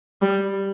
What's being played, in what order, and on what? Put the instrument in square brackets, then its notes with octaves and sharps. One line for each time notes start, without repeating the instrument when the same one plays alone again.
[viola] G3